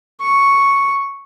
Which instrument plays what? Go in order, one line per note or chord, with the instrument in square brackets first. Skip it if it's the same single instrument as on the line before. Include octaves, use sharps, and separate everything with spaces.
[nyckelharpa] C#6